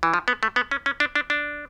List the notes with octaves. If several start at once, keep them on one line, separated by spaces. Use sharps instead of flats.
E3
F3
B3
A3
B3
C#4
C#4
D4
D4
D4